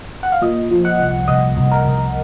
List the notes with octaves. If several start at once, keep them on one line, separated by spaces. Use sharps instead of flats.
F#5
F5
A#2 D#5
F3
F#5
C2
C2 D#5
C2
A#4
C2